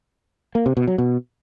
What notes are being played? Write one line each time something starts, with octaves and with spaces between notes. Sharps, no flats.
A#3
C3
B2
F#3
B2